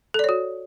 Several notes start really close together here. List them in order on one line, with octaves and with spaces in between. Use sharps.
A4 D5 C#5 F#4